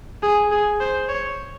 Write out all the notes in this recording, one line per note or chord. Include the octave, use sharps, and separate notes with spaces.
G#4
G#4
C5
C#5